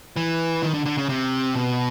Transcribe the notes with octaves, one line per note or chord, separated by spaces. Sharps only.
E3
D#3
D3
D3
C#3
C3
B2